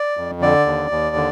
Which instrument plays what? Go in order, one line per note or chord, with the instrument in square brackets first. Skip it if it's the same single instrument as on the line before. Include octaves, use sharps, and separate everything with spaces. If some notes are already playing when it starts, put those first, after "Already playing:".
Already playing: [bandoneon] D5
F2
D3 D5
D#2
D#2
D3